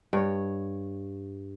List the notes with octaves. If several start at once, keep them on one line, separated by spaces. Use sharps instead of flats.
G2 C#5